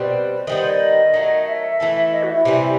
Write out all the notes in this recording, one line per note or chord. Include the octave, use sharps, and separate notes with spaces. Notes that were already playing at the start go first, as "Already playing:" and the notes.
Already playing: B2 G3 C4 B4
D#3 G3 B3 C5
C5
D#5
D#3 F#3 A3
E5
E3 A3 E4 A4
D#5
F#4
E4
C3 E3 G3